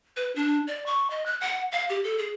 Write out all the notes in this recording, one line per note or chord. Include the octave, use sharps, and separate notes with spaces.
B4
D4
D5
C#6
D#5
F#6
F#5
F5
G4
A4
G#4